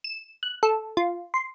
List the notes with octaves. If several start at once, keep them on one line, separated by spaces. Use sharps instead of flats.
E7
F#6
A4
F4
C6